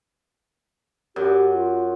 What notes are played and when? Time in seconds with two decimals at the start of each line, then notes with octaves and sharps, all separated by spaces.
1.16 F#2 G4
1.54 F4